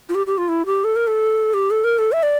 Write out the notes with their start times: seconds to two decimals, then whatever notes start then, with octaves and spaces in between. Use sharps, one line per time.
0.09 F4
0.15 G4
0.27 G4
0.38 F4
0.48 E4
0.66 G4
0.84 A4
0.96 A#4
1.07 A4
1.54 G4
1.70 A4
1.84 A#4
1.98 A4
2.12 E5
2.23 D5